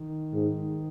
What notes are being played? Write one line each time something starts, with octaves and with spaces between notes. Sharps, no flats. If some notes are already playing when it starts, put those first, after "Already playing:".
Already playing: D#3
G#2